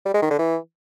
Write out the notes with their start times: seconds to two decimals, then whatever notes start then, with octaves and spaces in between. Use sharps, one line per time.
0.06 G3
0.14 G#3
0.22 D#3
0.31 D3
0.39 E3